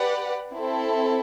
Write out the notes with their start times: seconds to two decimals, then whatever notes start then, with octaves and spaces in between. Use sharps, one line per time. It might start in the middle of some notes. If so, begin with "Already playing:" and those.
Already playing: G4 B4 D5 F#5
0.52 C4 E4 A4